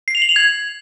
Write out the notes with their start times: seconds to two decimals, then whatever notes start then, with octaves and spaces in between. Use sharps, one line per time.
0.08 C7
0.15 F7
0.22 F#7
0.29 F7
0.36 G#6